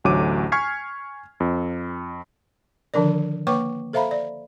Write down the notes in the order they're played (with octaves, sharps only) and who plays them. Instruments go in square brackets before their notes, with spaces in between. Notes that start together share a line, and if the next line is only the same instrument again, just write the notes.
[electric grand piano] A1 D2 F#3 A3 D6 D#7
G#5 C#6 F6 G#6 B6 C7
F2
[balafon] D3 D#3 F3 D4 A#4 D5
A#3 B4 C#5 G5 C#6 D6
A4 C5 E5 F5 A#5 B5
D5